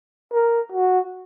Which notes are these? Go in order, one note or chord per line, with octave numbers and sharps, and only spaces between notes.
A#4
F#4